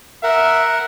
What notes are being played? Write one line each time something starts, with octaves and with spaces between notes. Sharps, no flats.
A#4 E5 F#5